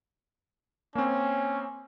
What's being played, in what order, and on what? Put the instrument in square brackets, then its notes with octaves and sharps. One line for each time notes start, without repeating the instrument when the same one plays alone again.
[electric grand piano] A#3 C4 [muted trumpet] C#4